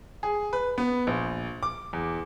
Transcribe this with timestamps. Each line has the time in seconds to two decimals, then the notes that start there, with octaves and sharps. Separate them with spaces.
0.23 G#4
0.53 B4
0.78 B3
1.07 A#1
1.63 D6
1.93 E2